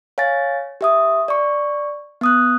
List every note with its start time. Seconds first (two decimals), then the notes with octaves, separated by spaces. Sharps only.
0.18 C#5 F5 G#5 A6
0.81 G4 E5 D#6
1.28 D5 C#6
2.21 B3 D#6 F#6